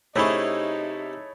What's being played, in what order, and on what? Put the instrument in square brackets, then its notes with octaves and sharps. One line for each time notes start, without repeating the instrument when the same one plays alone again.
[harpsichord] C3 C#4 [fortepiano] A3 E4 G#4 [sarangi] D#4 [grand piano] C#5 B5